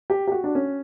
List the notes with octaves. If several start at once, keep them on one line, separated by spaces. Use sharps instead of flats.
G4
G4
F#4
D4
C#4